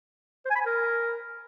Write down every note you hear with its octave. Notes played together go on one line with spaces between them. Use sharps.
C5
G#5
B5
G#5
A#4